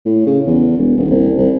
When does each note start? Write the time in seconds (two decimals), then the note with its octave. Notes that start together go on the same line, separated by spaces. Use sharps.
0.06 A2
0.26 C#3
0.47 E2
0.77 E1
0.97 D#1
1.10 C2
1.38 C2